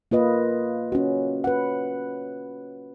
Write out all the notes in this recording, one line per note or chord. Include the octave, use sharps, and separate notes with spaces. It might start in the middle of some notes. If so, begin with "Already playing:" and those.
A#3 F4 B4 D#5
C#4 F#4
B4 F#5